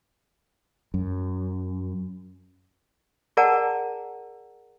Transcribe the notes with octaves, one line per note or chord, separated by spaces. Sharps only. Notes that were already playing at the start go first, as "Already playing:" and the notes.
F#2
G#4 A#4 D5 F#5 A5 A#5